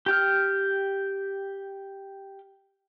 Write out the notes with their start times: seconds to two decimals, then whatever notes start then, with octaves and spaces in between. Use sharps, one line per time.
0.06 G4 G5 F6